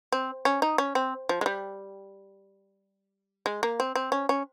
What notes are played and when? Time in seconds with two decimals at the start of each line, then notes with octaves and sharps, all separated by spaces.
0.12 C4
0.45 C#4
0.62 D#4
0.78 C#4
0.95 C4
1.29 F3
1.41 G#3
1.46 G3
3.46 G#3
3.63 A#3
3.80 C4
3.95 C4
4.12 C#4
4.29 C#4